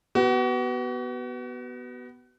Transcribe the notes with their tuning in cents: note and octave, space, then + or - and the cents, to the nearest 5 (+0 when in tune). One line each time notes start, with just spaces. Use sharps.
B3 +0 F#4 +35